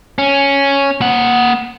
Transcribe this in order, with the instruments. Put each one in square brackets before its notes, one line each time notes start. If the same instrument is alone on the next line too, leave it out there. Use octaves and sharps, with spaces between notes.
[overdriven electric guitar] C#4
A#3 F#5